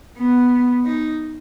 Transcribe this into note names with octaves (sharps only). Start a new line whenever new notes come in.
B3
D#4